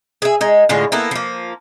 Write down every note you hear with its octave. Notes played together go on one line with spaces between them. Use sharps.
G#4 E5
G#3 D#4
A2 D3 G#3 F4
A#3 B3 E4 A4
F3 A#3